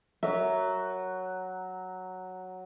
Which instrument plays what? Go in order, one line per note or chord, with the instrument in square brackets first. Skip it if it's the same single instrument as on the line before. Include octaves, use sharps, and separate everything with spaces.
[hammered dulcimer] F#3 [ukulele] A#4 E5